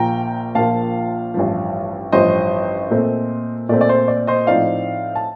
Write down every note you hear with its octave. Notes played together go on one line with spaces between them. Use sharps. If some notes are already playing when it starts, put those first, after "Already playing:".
Already playing: A#1 A#2 F3 A#3 F4 G5 A#5
A#1 A#2 F3 A#3 F4 F5 A5
A1 G2 F3
A1 G2 F3 C5 D#5
A#2 A3 C4
A#2 A3 C4 D5
D5
C5
D5
C5 D#5
A2 F3 C4 D#4 D5 F5
A5